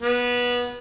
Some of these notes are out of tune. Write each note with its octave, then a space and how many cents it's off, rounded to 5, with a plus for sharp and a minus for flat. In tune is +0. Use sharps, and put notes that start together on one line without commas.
B3 -20